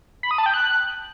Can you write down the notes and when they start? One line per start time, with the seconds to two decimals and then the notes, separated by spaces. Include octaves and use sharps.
0.23 B5
0.31 D#6
0.38 A5
0.46 G5
0.54 F#6